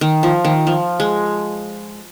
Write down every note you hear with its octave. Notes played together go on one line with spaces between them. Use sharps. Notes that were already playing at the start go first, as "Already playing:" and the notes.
D#3
F3
D#3
F3
G#3